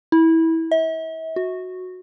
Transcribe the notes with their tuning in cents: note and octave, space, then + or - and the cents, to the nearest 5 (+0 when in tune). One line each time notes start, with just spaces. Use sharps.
E4 -20
E5 -40
F#4 -10